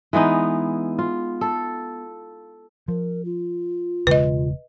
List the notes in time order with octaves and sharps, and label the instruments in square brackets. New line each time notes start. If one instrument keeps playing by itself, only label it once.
[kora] E3 G#3 B3 D#4
F4
A4
[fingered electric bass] F3 [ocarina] A#4
[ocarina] F4
[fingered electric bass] E1 C#3 G#3 [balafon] B4 D#5